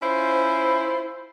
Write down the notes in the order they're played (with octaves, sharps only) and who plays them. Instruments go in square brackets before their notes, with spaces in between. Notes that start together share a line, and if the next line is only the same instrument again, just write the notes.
[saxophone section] C#4 E4 F4 C5